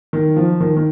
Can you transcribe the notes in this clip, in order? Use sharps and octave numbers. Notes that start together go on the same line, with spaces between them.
D#3
F3
D#3
D#3